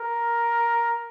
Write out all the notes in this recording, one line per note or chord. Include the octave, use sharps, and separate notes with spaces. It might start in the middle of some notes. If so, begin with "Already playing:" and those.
Already playing: A#4